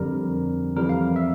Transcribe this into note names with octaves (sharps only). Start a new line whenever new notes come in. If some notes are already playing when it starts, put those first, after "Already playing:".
Already playing: F2 D3 G3 A#4
F2 E3 G3 A#4
F5
E5